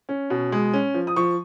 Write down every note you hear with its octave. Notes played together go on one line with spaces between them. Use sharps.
C#4
B2
G#3
C#4
F3
D#6
F3 C#6